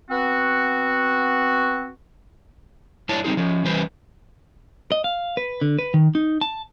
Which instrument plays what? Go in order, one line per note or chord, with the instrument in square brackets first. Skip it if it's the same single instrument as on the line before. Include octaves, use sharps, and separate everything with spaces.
[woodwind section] B3 C4 F#4
[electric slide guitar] G2 D4 E4 C#5 A5
G3 C4 D#4 G#4
F3 C#4
E3 G3 C#4 B4 C5
[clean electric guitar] D#5
F5
B4
D3
B4
D#3
D#4
A5